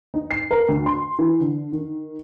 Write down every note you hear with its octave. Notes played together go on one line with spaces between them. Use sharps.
D#4
C7
A#4
D2
C6
E3
D3
D#3